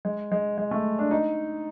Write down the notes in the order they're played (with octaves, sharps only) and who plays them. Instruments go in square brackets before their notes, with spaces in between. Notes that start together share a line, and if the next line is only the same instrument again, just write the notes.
[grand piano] G#3
G#3
G#3
A3
D4
D#4